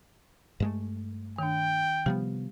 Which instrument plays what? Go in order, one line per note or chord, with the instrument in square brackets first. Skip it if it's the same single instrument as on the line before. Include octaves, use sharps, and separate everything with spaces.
[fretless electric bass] G2 G#3 A3
[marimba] D#3 D4 [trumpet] G5
[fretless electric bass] C3 F3 B3 [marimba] G3 G4